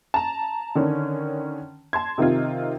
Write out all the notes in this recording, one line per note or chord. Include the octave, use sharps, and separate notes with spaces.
A5 A#5
D3 D#3 C#4
A5 C6 G#6
C3 D#3 C4 D#4 F4